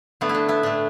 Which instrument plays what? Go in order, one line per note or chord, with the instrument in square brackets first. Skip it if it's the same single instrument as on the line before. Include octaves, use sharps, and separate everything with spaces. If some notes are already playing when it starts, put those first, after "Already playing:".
[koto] D3 A3 B3
E4
D4
B3 E4
A2 A3 D4